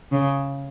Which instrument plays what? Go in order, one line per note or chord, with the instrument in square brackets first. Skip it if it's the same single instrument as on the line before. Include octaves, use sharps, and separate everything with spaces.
[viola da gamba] C#3